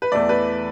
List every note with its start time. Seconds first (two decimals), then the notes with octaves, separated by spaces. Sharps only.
0.02 B4
0.12 E2 E3 A3 D5
0.29 B4